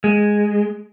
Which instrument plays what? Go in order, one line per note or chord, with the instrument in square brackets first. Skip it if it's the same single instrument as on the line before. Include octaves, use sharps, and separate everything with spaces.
[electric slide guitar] G#3